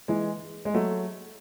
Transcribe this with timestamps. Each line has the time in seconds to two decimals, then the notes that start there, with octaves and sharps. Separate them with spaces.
0.08 E3 G#3
0.65 G#3
0.74 F#3 A3